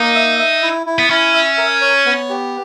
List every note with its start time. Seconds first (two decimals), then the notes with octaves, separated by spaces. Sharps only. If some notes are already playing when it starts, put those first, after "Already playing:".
Already playing: A#3 D#4
0.15 E5
0.39 E5
0.62 E4
0.86 E4
0.99 B3
1.10 C#4 E4
1.34 E5
1.58 A#4
1.81 C#5
2.06 B3
2.30 G4